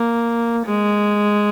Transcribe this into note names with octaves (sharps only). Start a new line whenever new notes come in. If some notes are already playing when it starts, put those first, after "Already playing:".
Already playing: A#3
G#3